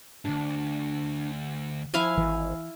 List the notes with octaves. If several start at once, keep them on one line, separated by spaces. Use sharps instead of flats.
D2 G#2 D4
F3 E4 F5 G#5
G#1 E3